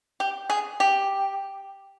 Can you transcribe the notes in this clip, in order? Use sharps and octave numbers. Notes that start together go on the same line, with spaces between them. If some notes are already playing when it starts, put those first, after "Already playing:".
G4
G#4
G4